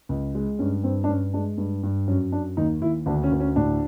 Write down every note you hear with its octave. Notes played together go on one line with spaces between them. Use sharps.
C#2
G#3
G2 C#4
G2 C4
D4
G2 C#4
G#3 D4
G2
G2
F#2 C#4
F#2 D4
D#2 D#4
D#2 E4
D2 D4
C#4
D2
C#4
A2 D4